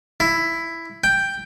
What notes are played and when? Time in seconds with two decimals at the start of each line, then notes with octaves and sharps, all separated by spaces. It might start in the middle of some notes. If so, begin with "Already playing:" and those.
0.20 E4
1.04 G5